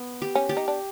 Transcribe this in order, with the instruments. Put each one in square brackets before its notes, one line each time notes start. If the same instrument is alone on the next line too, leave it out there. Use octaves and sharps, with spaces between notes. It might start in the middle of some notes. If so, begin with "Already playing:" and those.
Already playing: [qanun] B3
G4
[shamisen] C#4
[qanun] G4
[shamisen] D#4
D4